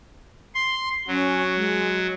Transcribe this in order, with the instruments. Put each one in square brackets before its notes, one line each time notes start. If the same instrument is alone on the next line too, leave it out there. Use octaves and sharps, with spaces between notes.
[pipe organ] C6
[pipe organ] F#3 [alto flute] C#4
[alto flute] G#3